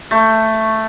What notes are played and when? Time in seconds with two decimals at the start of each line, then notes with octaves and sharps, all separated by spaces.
0.11 A3